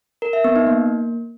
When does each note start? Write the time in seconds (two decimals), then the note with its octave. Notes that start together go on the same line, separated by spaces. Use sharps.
0.22 A#4
0.33 E5
0.44 B3
0.56 D#4
0.67 A#3